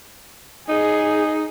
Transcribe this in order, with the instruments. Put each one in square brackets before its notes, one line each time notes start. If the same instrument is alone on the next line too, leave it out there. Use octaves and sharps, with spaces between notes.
[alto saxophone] D#4 [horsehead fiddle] G#4